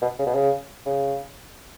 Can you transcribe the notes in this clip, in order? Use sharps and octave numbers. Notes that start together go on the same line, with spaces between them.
B2
C#3
B2
C#3
C#3